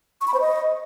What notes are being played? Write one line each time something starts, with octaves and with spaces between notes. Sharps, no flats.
C#6
B5
C5
D#5